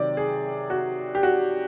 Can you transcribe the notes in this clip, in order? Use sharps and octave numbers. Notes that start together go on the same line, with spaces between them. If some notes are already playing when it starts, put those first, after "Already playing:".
Already playing: C3 D#3 F#3 D5
G#4
F#4
G4
F#4